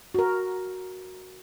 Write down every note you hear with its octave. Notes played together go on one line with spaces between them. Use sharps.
F#4 A#4